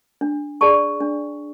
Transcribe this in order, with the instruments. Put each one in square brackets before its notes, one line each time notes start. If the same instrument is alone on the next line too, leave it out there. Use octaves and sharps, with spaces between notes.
[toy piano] D4
G#4 D5 A5 C#6
D4